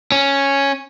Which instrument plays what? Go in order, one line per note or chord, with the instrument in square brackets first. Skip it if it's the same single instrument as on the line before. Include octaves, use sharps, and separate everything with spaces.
[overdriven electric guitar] C#4